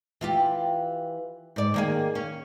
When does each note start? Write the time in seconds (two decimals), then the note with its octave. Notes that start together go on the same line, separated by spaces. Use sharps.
0.21 E3 F4 G4
1.56 G#2 D5
1.74 D#3 A#3 G#4
2.15 C#4